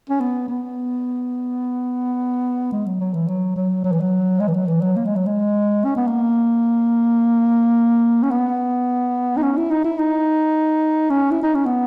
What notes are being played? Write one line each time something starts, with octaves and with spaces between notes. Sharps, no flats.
C#4
B3
B3
G#3
F#3
F#3
E3
F#3
F#3
F#3
E3
F#3
G#3
E3
F#3
E3
F#3
A#3
G#3
F#3
G#3
C#4
B3
A#3
C#4
B3
D#4
C#4
E4
D#4
E4
D#4
C#4
E4
D#4
C#4
B3